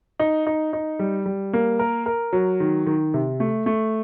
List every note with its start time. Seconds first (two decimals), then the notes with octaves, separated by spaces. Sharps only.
0.19 D#4
0.47 D#4
0.73 D#4
0.99 G3
1.26 G3
1.53 A#3
1.79 A#4
2.06 A#4
2.33 F#3
2.60 D#3
2.86 D#3
3.14 C3
3.40 A3
3.66 A3